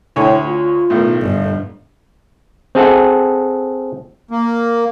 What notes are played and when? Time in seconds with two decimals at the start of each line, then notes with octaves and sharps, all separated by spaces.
0.16 D2 A2 C#5 G#5
0.47 F4
0.90 B1 A2 D#3
1.22 G1
2.75 C4 G#4 A4 F#5
4.31 A#3